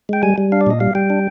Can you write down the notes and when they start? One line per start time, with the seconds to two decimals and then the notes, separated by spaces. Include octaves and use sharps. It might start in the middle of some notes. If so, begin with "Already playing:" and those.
0.09 G#3 G5
0.23 G3 G#5
0.38 G3
0.52 D4 F5
0.61 D5
0.67 A#2 D#5
0.80 G3 F5
0.95 G3 G5
1.10 D4